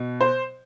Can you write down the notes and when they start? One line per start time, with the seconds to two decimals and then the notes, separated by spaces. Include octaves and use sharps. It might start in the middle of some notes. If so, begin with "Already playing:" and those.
Already playing: B2
0.21 C5